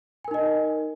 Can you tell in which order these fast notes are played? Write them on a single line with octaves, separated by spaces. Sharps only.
G#5 A#4 D#4 D#5